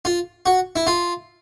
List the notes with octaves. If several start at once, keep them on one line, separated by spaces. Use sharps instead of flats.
F4
F#4
E4
F4